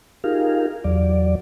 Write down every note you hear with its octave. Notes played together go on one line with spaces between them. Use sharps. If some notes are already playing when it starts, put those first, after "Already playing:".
D#4 F4 G4 G#4 A#4 F5
E2 F#3 D5